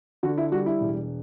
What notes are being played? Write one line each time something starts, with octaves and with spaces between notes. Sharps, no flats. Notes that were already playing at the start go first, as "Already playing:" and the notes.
D3 F#4
E4
G3 F#4
E4
E1